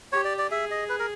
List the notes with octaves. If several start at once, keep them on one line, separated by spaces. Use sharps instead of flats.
G4 C#5
D5
D5
G#4 E5
D#5
B4
A#4